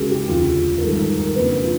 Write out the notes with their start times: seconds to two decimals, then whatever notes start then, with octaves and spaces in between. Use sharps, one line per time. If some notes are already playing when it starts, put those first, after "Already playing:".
Already playing: C#2 C#3 F#3 G#4 A#4
0.11 G4
0.28 E1 D2 C#3 F4
0.77 A#4
0.82 G#2 D#3 G3 A4
1.00 A#4
1.18 A#4
1.35 F2 C#3 F3 A#3 D4 B4
1.62 F4